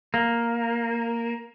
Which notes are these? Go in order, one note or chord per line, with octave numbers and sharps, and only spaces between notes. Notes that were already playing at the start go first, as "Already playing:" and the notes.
A#3